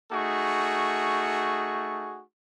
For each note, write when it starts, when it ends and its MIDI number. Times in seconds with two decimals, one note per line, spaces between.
0.11 2.22 57
0.11 2.22 63
0.11 2.22 66
0.11 2.22 68
0.11 2.22 85